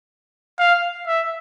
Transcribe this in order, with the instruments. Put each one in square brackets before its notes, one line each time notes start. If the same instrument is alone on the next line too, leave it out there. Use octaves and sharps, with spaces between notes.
[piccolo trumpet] F5
E5